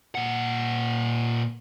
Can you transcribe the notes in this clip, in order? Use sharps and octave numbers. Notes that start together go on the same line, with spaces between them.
A#2 F#5